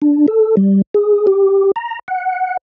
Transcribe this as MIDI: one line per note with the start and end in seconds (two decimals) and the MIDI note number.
0.02 0.26 62
0.28 0.55 69
0.57 0.82 55
0.94 1.26 68
1.27 1.71 67
1.76 1.99 82
2.08 2.57 78